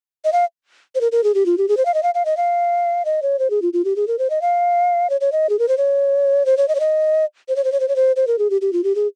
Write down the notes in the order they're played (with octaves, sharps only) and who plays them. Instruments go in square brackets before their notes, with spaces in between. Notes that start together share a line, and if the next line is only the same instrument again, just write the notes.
[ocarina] D#5
F5
C5
A#4
A#4
G#4
G4
F4
G4
G#4
C5
F5
D#5
F5
F5
D#5
F5
D#5
C#5
C5
G#4
F4
F4
G4
G#4
A#4
C5
D#5
F5
C#5
C#5
D#5
G#4
A#4
C5
C#5
C5
C#5
D#5
C#5
D#5
C5
C#5
C5
C#5
C5
C#5
C5
C5
A#4
G#4
G4
G4
F4
G4
G#4